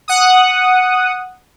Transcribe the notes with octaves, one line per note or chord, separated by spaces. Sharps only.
F#5 D#6